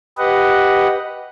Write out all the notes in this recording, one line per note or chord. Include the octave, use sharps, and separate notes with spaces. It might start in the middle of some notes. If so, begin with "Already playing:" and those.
G4 B4 D#5 F#5